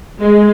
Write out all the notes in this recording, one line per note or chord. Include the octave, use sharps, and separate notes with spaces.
G#3